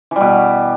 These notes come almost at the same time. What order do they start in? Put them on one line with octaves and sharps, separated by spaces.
E3 G3 B2